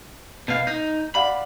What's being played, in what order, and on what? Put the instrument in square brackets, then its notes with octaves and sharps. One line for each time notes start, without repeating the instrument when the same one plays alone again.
[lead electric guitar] B2 F5
D#4
[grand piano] D5 F5 F#5 [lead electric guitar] B5